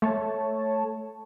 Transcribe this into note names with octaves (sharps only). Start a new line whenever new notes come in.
A3 C#5 A5